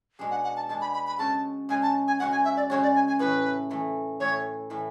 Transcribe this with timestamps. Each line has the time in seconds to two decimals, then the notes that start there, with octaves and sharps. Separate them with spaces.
0.19 B2 G#3 D4 G#4
0.31 F#5
0.44 F#5
0.56 A5
0.69 B2 G#3 D4 G#4 A5
0.81 B5
0.94 B5
1.07 B5
1.19 C#3 G#3 C#4 F#4 A5
1.69 C#3 G#3 C#4 F#4 G#5
1.82 A5
2.07 G#5
2.19 C#3 G#3 C#4 F#4 F#5
2.32 G#5
2.44 E5
2.56 D5
2.70 C#3 G#3 C#4 F#4 C#5
2.83 D5
2.95 G#5
3.08 G#5
3.19 A2 E3 A3 E4 B4
3.70 A2 E3 A3 E4
4.20 A2 E3 A3 E4 C#5
4.70 A2 E3 A3 E4